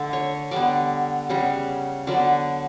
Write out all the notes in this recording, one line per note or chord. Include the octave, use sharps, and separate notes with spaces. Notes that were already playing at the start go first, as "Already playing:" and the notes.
Already playing: D3 A3 A4
C#5
D3 G3 B3 D5
C#3 G3 B3
D3 F#3 B3 D5